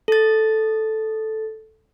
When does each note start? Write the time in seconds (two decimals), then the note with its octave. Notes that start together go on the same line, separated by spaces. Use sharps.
0.08 A4 A6